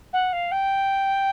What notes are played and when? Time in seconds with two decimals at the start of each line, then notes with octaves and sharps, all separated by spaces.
0.13 F#5
0.33 F5
0.51 G5